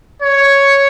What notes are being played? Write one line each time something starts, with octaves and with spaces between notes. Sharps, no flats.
C#5